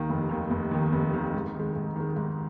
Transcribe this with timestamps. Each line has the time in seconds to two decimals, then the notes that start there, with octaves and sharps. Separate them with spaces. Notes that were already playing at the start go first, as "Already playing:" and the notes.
Already playing: D#2 D#3
0.09 F1
0.29 D#2 D#3
0.50 F1
0.71 D#2 D#3
0.92 F1
1.14 D#2 D#3
1.34 G#2
1.55 D#3 G#3
1.76 G#2
1.96 D#3 G#3
2.16 G#2